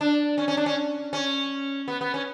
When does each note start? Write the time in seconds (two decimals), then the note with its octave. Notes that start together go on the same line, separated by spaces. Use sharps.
0.01 D4
0.38 C#4
0.48 C#4
0.57 D4
0.66 C#4
1.13 C#4
1.88 B3
2.01 B3
2.14 C#4